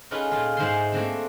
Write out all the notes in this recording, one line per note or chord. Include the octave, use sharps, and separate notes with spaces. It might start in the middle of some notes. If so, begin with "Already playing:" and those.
C#4 D#4 F4 G#4 A4 B4
A#2 F4
G#2 D#4 C5 E5 F5 C6
A3 A#3 C4 D4